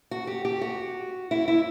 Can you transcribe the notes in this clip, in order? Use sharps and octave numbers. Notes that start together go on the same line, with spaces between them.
F#4
G4
G4
F#4
E4
E4